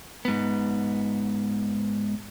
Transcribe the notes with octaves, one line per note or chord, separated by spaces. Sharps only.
G#2 B3